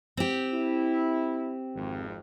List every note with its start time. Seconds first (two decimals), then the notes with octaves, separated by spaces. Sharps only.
0.17 C4 G4
0.53 E4
1.75 G#1 F2